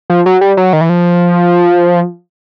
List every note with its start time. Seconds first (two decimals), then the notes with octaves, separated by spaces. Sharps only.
0.10 F3
0.26 F#3
0.41 G3
0.57 F#3
0.73 D#3
0.81 E3
0.89 F3